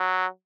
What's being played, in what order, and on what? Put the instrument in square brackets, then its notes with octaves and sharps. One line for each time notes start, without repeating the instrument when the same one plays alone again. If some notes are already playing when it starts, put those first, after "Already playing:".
Already playing: [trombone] F#3